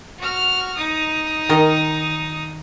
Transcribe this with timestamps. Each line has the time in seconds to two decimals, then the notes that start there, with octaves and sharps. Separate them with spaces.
0.19 F#4 F6
0.77 D#4 D#6
1.49 D#3 A#4 D#5